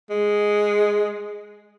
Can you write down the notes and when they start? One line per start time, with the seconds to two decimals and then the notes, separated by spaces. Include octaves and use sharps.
0.10 G#3